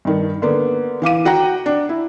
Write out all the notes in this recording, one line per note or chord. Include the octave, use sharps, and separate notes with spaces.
G2 D#3
D3 A#3 B3
E3 F5 D6 D#7
F#4 F#5 G5 A#5
D4
E4